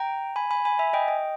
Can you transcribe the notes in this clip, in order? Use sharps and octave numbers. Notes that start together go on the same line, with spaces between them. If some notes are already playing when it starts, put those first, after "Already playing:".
Already playing: G5 A#5
G#5 B5
G#5 B5
G#5 B5
E5 G#5
D#5 G5
D#5 G5